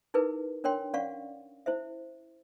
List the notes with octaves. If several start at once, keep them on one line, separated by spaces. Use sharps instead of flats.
D#4 E4 G#4 A#4 B4
D4 A#4 C#5 G5 C6
C#4 D5 F5 F#5 C#6
E4 C5 E5